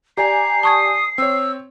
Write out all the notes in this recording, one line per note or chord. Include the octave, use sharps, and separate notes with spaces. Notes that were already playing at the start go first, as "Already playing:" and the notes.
G4 D5 G#5 A#5 C7
A5 C#6 D#6 G#6
C4 C#5 E6